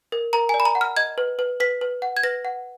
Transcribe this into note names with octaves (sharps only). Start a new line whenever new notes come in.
A#4
A#4 A#5
D5 G#5
B5
A#5
F#5
F6
D#5 G#6
B4
B4
B4 B6
B4
F#5
G#6
B4 A#6
F#5